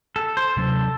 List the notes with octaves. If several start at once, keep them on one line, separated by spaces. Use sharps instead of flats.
A4
C5
C3 F#3 C#4 A4